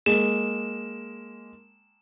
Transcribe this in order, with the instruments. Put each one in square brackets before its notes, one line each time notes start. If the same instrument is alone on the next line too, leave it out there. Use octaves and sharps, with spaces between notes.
[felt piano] G#3 A#3 [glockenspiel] E7